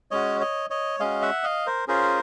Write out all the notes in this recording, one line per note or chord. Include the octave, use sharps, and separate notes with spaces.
G#3 C#4 F#4 C#5 D#5
C#5 D#5
C#5 D#5
G#3 C#4 F#4 D#5 F5
E5 F#5
D#5 F5
A#4 C5
C#4 F4 G#4 A#4 C5